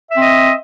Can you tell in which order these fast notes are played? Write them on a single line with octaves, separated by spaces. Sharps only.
E5 C4 D#5